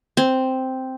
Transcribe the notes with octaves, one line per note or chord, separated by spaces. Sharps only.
C4